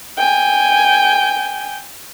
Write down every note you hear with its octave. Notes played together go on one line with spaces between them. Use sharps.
G5 G#5